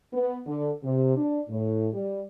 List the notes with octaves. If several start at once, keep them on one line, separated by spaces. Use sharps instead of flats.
B3
D3
C3
D4
A2
G3